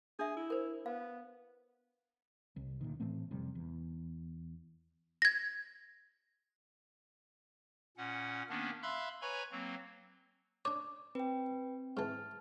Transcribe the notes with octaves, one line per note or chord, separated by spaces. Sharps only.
D4 G#4 E5
E4
A#4 C5
B3 F5
C2
D2 A#2 D#3
A2 E3 A3 C4
F1 C3 G3
E2
G#6 A#6
A#2 C#4 F#5
D#3 A#3 B3 C#4 D4
E5 F5 B5 C6 E6 F#6
B4 C#5 G#5 A#5 B5 C#6
F#3 A#3 C4
D4 C#5 D6
C4 B4 G5
G#2 E3 A5 F6